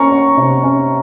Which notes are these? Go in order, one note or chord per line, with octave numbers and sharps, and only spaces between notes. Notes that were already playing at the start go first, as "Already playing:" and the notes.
Already playing: A#3 C#4 A#5 C#6
C#4
C3
C#4